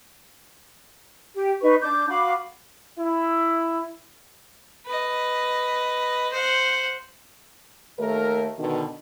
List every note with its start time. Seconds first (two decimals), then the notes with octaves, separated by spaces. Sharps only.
1.35 G4
1.61 D#4 B4 C#6
1.82 D4 D6 G6
2.09 F#4 F5 B5 D6
2.99 E4
4.86 B4 D#5
6.33 C5 F#5
7.98 D#2 A3 A#4
8.58 B2 D3 D#3